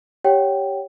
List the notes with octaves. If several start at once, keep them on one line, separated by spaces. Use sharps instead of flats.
G4 C#5 F#5 G5